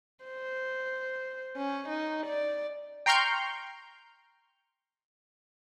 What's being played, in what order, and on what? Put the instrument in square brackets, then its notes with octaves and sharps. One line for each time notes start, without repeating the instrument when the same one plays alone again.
[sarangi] C5
C#4
D#4
D5
[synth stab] G5 A#5 C6 C#6 F6 G6